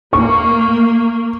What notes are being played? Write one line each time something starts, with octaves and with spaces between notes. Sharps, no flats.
A#3 C#6